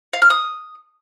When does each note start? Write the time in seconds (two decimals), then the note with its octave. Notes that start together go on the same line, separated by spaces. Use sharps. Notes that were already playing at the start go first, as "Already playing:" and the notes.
0.13 F5
0.22 F6
0.30 D#6